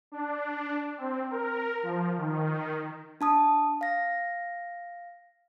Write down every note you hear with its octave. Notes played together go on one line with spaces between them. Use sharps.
D4
C4
A#4
F3
D#3
D4 A5 D#6
F5 A#6